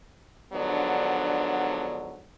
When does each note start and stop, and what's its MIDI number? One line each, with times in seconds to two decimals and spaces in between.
0.53 2.26 44
0.53 2.26 50
0.53 2.26 53
0.53 2.26 54
0.53 2.26 59
0.53 2.26 62